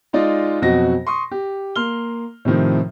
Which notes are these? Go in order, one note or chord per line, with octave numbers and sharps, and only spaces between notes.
G#3 D#4 F4 D5 D#5
F2 B2 F#3 F#4 D#5 A#6
C6 C#6 D#6
G4
A#3 C6 F6 G7
A2 C3 D#3 F3